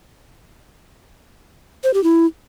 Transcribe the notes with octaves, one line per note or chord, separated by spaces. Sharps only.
C5
G4
E4